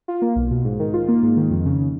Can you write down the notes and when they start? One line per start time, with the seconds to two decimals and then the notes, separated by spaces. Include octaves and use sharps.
0.08 F4
0.22 A#3
0.36 B1
0.50 B2
0.65 G#2
0.79 D#3
0.94 F4
1.08 A#3
1.22 G#2
1.37 D#3
1.51 F2
1.65 C#3